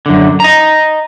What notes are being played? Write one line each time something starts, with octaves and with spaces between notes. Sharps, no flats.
F#2 D3
D#5 A#5